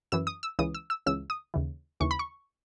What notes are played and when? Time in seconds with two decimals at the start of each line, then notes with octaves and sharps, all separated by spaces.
0.12 F#2 E3 E6
0.27 D#6
0.43 E6
0.59 C#2 C#3 E3 D#6
0.75 E6
0.90 E6
1.06 C#2 C#3 E3 E6
1.30 D#6
1.54 D#2 C#3 E3
2.00 D#2 C#3 E3 C#6
2.11 B5
2.19 C#6